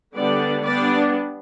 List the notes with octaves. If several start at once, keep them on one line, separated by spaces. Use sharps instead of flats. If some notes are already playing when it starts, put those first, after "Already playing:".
D3 G3 B3 D4 D5
G3 B3 D4 D5